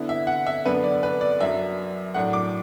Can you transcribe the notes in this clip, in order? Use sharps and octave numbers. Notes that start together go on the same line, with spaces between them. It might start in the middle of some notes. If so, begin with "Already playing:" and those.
Already playing: D3 B3 E4
E5
F#5
E5
F#2 D3 B3 D4 B4
D5
B4
D5
F#2 F#3 D4 E5
A2 F#3 D4 F#5
D6